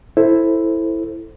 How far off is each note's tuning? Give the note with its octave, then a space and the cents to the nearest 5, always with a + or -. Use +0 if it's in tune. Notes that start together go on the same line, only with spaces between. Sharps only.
E4 +0 A4 +0 C5 +5